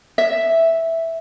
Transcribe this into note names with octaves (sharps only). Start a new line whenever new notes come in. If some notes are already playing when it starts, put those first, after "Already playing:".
E5